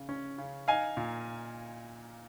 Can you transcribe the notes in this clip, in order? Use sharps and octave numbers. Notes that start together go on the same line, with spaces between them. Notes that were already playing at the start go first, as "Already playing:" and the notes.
Already playing: C#3
C#4
C#3
D#4 F5 G#5
A#2